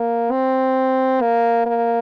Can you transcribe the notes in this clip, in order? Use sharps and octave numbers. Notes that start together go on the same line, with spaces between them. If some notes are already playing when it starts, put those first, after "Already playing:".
Already playing: A#3
C4
A#3
A#3